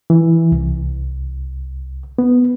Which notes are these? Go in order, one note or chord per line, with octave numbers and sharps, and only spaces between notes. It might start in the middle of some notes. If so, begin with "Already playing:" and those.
E3
C2
B3